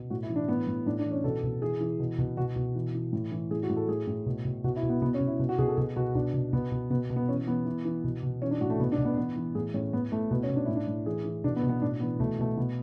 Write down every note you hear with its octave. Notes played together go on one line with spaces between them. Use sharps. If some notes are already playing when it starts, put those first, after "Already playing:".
Already playing: B2
A2 F#4
E4
E3
D4
A2 B3
A2
A2 D4
D4
E3
C#4
B2 A4
B2
E3 G#4
E3
B2
B2
B2 F#4
B2
E3
E3
A2
E3
A2 G#4
F#4
A2
A4
A2 G#4
A2
B2
B2
B2 F#4
E4
B2
B3
B2 B3
C#4
B2
E4
B2
F#4
B2 G#4
A4
B2 G#4
B2 F#4
B2 D4
B2
B2 B3
B2
B2 B3
B2
B3
E3 C#4
E3 B3
E3
E3
B2
B2
E3 C#4
D4
A2 F#4
A3
B2 B3
D4
B2
B3
E3 B3
E3
A2 G#4
A2 C#4
A2 B3
A2 A3
B2 B3
C#4
B2
D4
A2 E4
D4
A2
E3 G#4
E3
B2 D4
B3
B2
B3
A2 D4
E3 B3
B2 A3
B2 A3
B2 B3